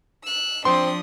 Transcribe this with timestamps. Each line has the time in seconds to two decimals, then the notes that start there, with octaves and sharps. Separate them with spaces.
0.22 E6 F#6
0.65 F3 C4 D4 C6 D#6